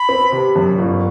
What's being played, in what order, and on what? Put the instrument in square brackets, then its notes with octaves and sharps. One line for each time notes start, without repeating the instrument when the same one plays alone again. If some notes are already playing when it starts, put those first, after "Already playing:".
Already playing: [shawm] B5
[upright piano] C4
C3
F#2
G1